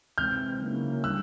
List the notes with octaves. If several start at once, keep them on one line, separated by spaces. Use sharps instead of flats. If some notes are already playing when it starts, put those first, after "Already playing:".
C3 E3 G#3 C4 D#4 F6 G6
C#3 F#3 A#3 C#4 E4
D3 G3 E6 F#6